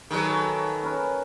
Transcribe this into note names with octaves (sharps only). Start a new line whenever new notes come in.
D#3 F#3 A4 B4 G#5
C#4 A#4 B4